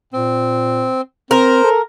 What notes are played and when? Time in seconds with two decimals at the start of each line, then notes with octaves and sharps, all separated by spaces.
0.13 A#2 C4
1.31 C4 A#4 C5
1.64 A4